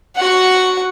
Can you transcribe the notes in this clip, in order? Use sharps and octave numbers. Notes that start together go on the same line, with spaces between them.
F#4 F#5